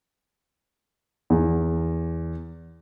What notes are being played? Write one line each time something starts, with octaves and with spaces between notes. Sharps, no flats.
E2